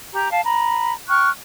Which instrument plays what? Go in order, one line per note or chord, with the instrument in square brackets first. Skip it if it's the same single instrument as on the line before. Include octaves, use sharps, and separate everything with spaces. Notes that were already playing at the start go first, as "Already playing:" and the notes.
[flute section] G4 A#5
F5 A5
A#5 B5
G5 C#6 F6 F#6